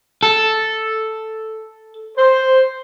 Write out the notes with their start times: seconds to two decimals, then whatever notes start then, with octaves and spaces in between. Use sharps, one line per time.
0.23 A4
2.17 C5